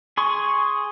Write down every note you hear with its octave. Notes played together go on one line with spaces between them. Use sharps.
G#4 C6 C#6